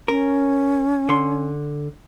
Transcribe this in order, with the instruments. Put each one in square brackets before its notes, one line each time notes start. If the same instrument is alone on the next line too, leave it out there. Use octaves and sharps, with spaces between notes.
[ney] C#4 [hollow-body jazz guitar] A#4
[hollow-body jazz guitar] D3 C6